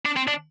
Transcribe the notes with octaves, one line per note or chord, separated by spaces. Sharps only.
D4
C4
D4